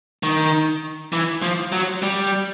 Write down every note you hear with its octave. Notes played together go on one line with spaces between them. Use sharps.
D#3
E3
F3
F#3
G3